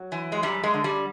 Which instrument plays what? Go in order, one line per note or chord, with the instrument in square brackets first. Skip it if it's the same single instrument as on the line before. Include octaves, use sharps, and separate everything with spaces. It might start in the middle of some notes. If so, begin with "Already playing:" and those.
Already playing: [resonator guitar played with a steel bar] F#3
E3
G#3
F#2 G3
G#3
D3
G3